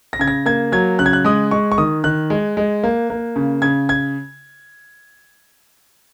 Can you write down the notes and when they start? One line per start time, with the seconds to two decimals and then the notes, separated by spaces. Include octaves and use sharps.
0.13 A#6
0.19 C#3 G#6
0.28 A#6
0.46 A#3 G#6
0.72 F#3 G#6
0.99 C#3 F#6
1.06 G#6
1.13 F#6
1.25 G#3 D#6
1.51 G#3 C#6
1.72 C#6
1.78 D#3 D#6
2.04 D#3 F#6
2.30 G#3
2.57 G#3
2.84 A#3
3.10 A#3
3.36 C#3
3.62 C#3 G#6
3.89 G#6